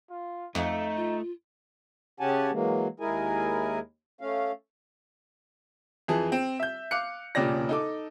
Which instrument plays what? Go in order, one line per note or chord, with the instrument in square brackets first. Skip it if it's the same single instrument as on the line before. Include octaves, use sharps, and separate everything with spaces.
[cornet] F4
[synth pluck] F2 [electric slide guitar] A3 [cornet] D#4 [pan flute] F5
[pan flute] F4
[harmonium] C#3 C#4 G4 F#5 G#5 A5
E3 F#3 G#3 A#3
D#2 G#3 E4 G#4 A#4 G#5
A3 C#4 F5
[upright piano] F2 E3 G#4 A5
C4
E5 G6
F5 D6 F#6 C#7
E1 A#2 C#3 G4 D5 A#6
D#4 A4 D6